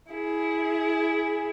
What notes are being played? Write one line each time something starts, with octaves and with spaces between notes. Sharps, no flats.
E4 G#4